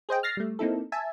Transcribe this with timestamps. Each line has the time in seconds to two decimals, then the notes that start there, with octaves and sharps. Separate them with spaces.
0.09 G#4 C5 D#5 G5
0.23 F6 A6 A#6 C7
0.37 G3 A3
0.59 A#3 C4 D#4 E4 A4
0.92 E5 G#5 A5